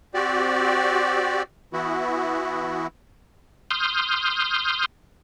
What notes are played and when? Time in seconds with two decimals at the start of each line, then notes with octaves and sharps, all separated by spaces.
0.14 C4 F#4 G4 D5
1.73 E3 B3 E4 F#4
3.71 C6 D#6 F6 G6